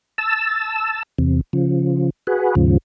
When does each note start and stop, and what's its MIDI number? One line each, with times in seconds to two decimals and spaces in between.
0.18 1.03 81
0.18 1.03 88
1.19 1.41 40
1.19 1.41 48
1.53 2.10 49
1.53 2.10 53
2.27 2.55 66
2.27 2.55 68
2.27 2.55 71
2.55 2.78 39
2.55 2.78 44
2.55 2.78 49
2.55 2.78 53